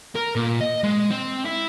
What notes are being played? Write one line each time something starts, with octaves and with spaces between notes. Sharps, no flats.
A#4
A#2
D#5
G#3
C4
E4